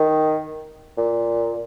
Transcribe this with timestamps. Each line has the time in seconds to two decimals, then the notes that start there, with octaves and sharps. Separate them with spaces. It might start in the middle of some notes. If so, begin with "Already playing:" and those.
Already playing: D#3
0.97 A#2